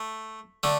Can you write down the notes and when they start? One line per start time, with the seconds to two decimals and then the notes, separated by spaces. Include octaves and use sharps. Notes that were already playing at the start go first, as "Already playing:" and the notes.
Already playing: A3
0.63 D3 A3